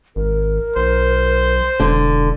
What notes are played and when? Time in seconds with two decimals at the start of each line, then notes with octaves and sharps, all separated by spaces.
0.16 G#1 A#4
0.76 B1 C5
1.80 E1 D3